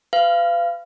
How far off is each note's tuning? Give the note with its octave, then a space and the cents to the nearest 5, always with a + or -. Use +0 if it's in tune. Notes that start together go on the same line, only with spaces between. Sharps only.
B4 +30 F5 -25